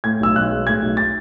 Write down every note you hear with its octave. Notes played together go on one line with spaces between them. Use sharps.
A2 G#6
B1 E6
B1 F#6
G#3
A2 G#6
B1
A6